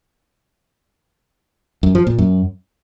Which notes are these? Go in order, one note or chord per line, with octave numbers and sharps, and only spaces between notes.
F#2
F3
A#2
F#2